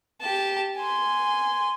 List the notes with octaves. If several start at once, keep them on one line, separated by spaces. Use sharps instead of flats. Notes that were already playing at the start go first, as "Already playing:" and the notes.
G4 A5
G#5 C6